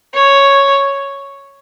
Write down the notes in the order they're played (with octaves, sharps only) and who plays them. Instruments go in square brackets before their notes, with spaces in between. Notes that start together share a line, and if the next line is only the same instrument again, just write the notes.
[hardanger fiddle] C#5